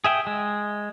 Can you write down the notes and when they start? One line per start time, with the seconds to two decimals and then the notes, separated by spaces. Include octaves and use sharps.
0.04 G#4 E5 G5
0.27 G#3